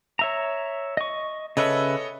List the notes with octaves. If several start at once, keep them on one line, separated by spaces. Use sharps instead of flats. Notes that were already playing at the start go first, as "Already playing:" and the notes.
C#5 E5 A#5
D#5 C#6
C#3 A4 B4 C#5 D#5 E5